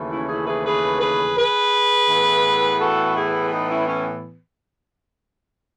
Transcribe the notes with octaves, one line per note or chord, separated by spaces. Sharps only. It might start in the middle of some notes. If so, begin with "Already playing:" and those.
Already playing: D#2 C#3 E3 A3
C#4 E4
E4 G#4
G#4 B4
G#4 B4
G#4 B4
G#4 B4
A2 E3 B3
F#4 A4
E4 G#4
D#4
C#4 E4
C#4